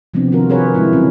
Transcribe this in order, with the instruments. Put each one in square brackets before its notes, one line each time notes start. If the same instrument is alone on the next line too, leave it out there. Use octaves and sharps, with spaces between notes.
[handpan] C3 F3 G3 B3 C4 D4
D#3 F4 F#4 A#4
G4 G#4 A#4 B4 C#5
G3 G#3 C4 D#4 E4
C#3 F#3 G3 C4 C#4